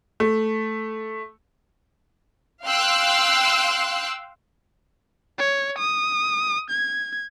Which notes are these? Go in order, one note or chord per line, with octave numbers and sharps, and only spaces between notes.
A3
F5 G5 C6 E6 F#6
C#5
D#6
G#6